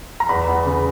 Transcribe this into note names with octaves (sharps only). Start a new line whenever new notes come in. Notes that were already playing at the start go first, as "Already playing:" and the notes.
A#5
E2 B5
E2
C#3